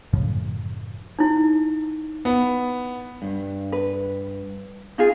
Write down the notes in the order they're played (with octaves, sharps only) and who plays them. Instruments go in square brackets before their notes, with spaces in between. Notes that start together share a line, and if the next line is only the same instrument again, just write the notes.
[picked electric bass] F#2 A2 C#3 F3
[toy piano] D#4 E4
[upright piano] B3
[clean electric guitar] G2
[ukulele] B4
D#4 F4 G#4